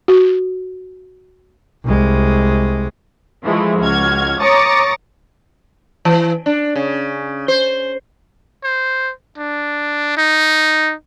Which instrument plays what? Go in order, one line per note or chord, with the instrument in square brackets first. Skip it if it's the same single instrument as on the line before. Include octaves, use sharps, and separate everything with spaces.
[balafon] F#4
[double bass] C2 G#3
[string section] E3 F3 G#3 A3 E4
C#2 F#4 F6 G#6
C#5 A#5 D6 D#6 A6 C#7
[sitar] E3
D4
C#3
C5
[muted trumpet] C5
D4
D#4